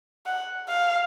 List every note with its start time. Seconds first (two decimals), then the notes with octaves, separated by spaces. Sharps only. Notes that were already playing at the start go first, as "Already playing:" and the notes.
0.26 F#5
0.69 F5